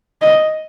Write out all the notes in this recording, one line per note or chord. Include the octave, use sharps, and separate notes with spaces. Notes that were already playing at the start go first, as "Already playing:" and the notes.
D#5